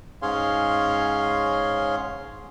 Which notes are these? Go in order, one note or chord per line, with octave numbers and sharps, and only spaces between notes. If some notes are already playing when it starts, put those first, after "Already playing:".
G#2 C#4 G#4 C#5 F5 C6